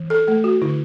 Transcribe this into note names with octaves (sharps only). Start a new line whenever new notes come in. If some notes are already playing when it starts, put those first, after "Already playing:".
Already playing: E3
A4
A3 A4
F#4
D3 E4